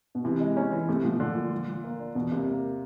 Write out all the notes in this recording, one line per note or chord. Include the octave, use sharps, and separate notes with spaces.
B2
C3 E3
G#3
C#4
E3
C3 A3
B2 F3
A#2 D3
F3
F3
F3
A#3
D4
E2 B2
C3 A#3
A#3